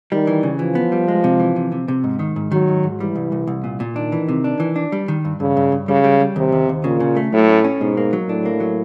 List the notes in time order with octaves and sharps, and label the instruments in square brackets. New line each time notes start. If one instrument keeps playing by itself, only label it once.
[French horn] D#3 [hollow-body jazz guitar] G3
[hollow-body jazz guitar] E3
C#3
[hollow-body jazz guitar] E3 [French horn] F3
[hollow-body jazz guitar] B3
G3
G#3
C3
E3
C3
C3
C3
G#2
D#3
G#2
[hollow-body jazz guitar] D#3 [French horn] F#3
[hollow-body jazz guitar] G#2
G#2
[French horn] E3 [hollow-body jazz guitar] G3
[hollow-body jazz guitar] C2
C2
C2
A#2
A#2
[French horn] D#3 [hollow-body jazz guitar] D4
[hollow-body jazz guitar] E3
C3
D4
E3
D4
G3
D#3
G2
[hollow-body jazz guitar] G2 [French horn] C#3
[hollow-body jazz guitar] G2
G2
[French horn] C#3 [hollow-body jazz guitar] G3
[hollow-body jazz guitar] G3
G3
[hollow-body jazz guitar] D#2 [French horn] C3
[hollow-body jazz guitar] D#2
D#2
[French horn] A#2 [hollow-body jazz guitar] C#3
[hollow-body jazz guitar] C#3
A3
[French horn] A2 [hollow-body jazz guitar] F#3
[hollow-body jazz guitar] C#4
C#4
[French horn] G#2 [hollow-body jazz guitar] B2
[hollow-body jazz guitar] A#3
F#3
[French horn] A2 [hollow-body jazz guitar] D4
[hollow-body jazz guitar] A#3
F#3